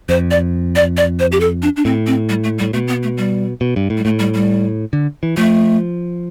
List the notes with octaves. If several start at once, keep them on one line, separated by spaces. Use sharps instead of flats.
F2 C5
D5
D5
D5
C5
G4
A4
D4
D4
A2 C4
C4
G3
A3
G3
A2
B2 A3
B3
A3
G3
B2
G2
A2
G3
A2 A3
G3
G3
D3
E3
F3 A3